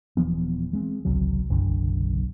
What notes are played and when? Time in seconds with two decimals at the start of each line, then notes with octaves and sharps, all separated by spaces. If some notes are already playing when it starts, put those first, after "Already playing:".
0.17 D#1 E3 F3 B3
0.73 G#3 C4
1.05 G#1 C#2 C3 F#3
1.50 F#1 B1 F#2 D3